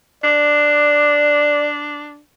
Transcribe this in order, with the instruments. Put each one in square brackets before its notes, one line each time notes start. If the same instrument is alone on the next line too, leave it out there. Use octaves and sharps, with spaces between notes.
[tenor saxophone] D4 [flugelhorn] D5